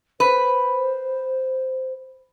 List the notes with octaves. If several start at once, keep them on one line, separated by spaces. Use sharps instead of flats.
B4 C5